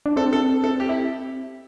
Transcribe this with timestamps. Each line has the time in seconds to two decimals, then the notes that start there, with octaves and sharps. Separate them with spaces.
0.06 D4
0.16 C4 A4
0.33 A4
0.64 A4
0.80 G4
0.89 E4